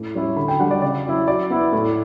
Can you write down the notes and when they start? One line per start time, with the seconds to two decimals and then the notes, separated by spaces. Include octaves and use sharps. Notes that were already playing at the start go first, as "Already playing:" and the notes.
Already playing: A2 D6
0.14 G3 C#4 E4
0.36 D3 B5
0.48 G5
0.60 G3 D4 F#5
0.71 D5
0.82 C#3 D5
1.05 F#3 C#4 E4
1.27 F#3 D5
1.50 B3 E4
1.73 A2